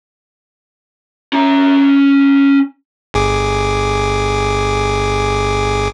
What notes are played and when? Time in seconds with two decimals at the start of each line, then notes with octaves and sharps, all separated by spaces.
1.33 C#4 A#5
3.14 G1 G#4 D6